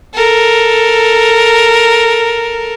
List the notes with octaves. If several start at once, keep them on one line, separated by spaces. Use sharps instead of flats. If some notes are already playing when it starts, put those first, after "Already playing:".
A4 A#4